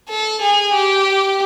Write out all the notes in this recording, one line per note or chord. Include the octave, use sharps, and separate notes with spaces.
A4
G#4
G4